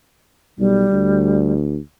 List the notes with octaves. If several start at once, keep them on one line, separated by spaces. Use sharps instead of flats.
B1 G3
D2